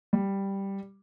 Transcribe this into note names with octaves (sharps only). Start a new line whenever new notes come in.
G3